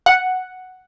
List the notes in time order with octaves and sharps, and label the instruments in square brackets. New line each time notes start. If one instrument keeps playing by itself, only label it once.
[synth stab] F#5